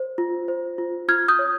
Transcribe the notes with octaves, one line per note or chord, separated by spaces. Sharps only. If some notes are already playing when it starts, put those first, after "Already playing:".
Already playing: C5
F4
C5
F4
F4 F6 G#6
D#6 G6
C#5